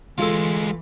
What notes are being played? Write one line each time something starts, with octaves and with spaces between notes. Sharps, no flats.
D2 E3 G#3 F4 A4